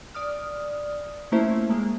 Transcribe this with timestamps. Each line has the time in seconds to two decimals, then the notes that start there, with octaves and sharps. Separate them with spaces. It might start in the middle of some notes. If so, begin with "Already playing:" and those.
0.14 D5 D#6 F6
1.32 A3 A#3 C#4 E4 C5 E5
1.70 G#3 A#3